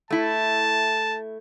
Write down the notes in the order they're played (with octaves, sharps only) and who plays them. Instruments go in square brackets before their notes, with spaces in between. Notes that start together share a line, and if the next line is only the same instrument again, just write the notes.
[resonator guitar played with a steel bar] A3 E4 [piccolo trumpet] A5